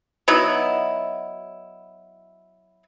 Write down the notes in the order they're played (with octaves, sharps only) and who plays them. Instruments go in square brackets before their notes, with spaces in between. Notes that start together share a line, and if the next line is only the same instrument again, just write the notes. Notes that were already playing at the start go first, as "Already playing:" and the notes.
[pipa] F#3 B3 D#4 E4